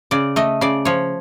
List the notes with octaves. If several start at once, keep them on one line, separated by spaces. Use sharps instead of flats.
C#3 D5
A3 D#5
C#3 D5
F3 C#5